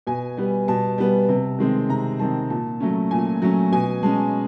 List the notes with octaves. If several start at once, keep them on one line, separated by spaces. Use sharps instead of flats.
B2 G#5
G3 B3
B2 A5
G3 B3
C3
D#3 G#3 C4
C3 A#5
D#3 G#3 C4 A5
A#2 A5
F#3 A3 C#4
A#2 G#5
F#3 A3 C#4
B2 G#5
G#3 C#4 A5